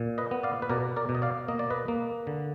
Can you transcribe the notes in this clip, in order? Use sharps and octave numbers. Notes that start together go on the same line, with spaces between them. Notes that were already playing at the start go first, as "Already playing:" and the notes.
Already playing: A#2
B4 D#5
B3
D5 F5
B4
B2 A#4 D5
A#4 D5
B2
D#5
D5 F5
A#3 D#5
D5
B4 D#5
A#3
D3